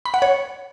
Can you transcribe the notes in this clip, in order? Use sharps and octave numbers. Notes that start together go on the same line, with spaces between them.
B5
F#5
C#5